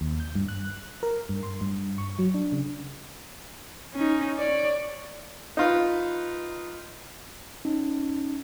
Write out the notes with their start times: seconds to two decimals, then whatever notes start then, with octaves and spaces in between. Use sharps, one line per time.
0.01 D#2
0.20 G6
0.35 G2
0.48 F#6
1.03 A#4
1.29 G2
1.43 C6
1.61 G2
1.98 C#6
2.19 F#3
2.34 D4
2.52 C#3
3.94 C#4 D#4
4.37 C#5 D5
5.57 D#4 F4 B4
7.65 C#4 D#4